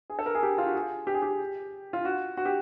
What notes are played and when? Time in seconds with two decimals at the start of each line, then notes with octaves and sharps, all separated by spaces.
0.10 G#4
0.19 A4
0.26 A#4
0.35 G#4
0.43 G4
0.58 F4
0.67 F#4
0.75 G#4
1.07 G4
1.14 G#4
1.22 G4
1.93 F4
2.05 F#4
2.37 F#4
2.45 G4